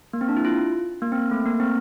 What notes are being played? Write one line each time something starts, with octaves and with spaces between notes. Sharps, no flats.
A#3
C4
D4
E4
F4
A#3
C4
A3
A#3
C4